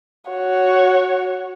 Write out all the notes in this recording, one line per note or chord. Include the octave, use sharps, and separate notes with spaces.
F#4 C#5